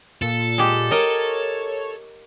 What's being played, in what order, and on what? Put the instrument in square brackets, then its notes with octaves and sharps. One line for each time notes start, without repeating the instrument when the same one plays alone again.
[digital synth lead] A#2 [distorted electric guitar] A4
[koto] G#3 G4
[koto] A#4 D#5 [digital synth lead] C#5